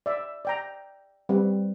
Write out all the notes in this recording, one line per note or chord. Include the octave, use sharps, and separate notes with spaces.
D5 E5
D5 G5 A#5
G3 C4 B4